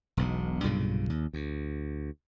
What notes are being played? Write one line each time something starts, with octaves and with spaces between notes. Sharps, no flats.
E1 B1 B2
B1 G2 A#2 C#3
D#2
D2